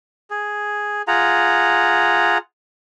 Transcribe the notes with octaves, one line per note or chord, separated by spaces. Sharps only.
G#4
F4 G#4 F#5 A#5